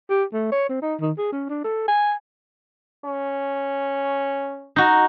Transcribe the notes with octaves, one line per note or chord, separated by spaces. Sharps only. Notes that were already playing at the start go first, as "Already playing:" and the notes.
G4
A3
C#5
C4
D#4
D#3
G#4
C#4
D4
A4
G#5
C#4
D#4 F#4